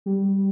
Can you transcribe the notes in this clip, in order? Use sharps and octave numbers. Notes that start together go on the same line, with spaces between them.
G3